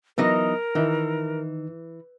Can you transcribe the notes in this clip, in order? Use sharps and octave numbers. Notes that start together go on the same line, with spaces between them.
E3 F#3 B3 D#4 A#4 D#5
D#3 E3 D#4 E4